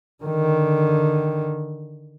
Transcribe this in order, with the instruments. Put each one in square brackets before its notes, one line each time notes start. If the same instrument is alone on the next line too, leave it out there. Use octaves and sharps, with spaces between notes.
[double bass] D3 D#3